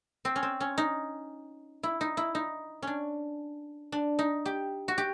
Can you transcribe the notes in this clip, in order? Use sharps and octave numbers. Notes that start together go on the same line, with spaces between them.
C4
C#4
C4
C#4
D#4
E4
D#4
E4
D#4
C#4 D4
D4
D#4
G4
F#4
G4